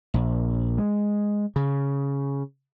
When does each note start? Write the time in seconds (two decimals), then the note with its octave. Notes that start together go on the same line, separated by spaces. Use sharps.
0.14 A#1
0.78 G#3
1.56 C#3